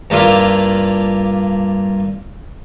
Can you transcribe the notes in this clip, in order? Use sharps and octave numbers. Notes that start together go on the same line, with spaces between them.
G2 A#3 D4 E4 F4